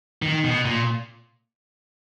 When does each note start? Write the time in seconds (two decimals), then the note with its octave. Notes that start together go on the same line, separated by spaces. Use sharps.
0.22 D#3
0.44 B2
0.65 A#2